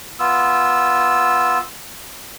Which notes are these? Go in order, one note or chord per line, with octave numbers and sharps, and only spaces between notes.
B3 F4 E6